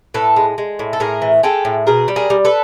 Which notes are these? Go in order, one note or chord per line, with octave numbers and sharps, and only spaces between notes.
A2 A4 B4
G#3
G#3
A2
A4
A2 G#4 A#4
E3
G#3 G4 A4
A2
B2 G#4 A#4
G3
G#4 A#4
G3
A4 B4